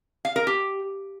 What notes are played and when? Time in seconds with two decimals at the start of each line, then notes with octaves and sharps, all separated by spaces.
0.25 F5
0.36 A#4
0.47 G4